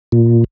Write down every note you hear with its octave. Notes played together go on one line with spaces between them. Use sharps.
A#2